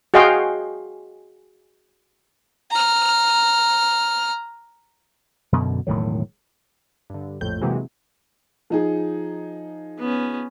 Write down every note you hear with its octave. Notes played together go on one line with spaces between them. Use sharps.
F#4 G#4 D#5 F5 G5 C6
A#5 F6
F#2 B2 D3
E1 A2 D#3 F#3
G2 D3
A#1 F2 A2 G6
C3 E3 F#3 G#3 A#3 C4
F3 D#4 G#4
B3 C#4